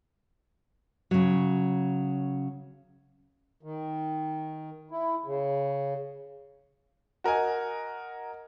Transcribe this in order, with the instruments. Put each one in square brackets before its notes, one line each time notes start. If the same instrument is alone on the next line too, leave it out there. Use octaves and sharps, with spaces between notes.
[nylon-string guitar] C#3 F#3
[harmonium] D#3
E4
C#3
[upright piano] F#4 A#4 D#5 G#5